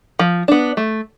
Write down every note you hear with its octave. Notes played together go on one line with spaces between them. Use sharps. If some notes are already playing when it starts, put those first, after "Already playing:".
F3
B3 D4
A3